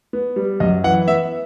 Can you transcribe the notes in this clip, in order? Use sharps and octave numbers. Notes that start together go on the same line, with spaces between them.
B3
G3
F#2 D#5
E3 F#5
B3 E5